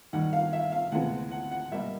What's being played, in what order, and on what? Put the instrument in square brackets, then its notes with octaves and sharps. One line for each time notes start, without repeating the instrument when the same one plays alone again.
[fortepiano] D#2 D#3 G3 F#5
F5
E5
F5
D2 C3 E3 G#3 B3 F#5
F#5
F#5
B2 G3 A#3 E5